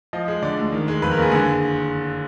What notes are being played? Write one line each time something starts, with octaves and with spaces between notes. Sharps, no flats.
F3 D#5
G#3
D3 D5
D2
D#3
G#3
F2 B4
A#4
F#1 G#4
D3 G#4